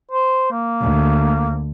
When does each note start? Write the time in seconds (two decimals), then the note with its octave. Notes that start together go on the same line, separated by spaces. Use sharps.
0.11 C5
0.52 A#3
0.82 D2